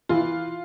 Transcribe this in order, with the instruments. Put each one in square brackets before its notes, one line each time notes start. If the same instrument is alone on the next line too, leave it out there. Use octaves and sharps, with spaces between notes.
[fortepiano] E3 [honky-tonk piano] F4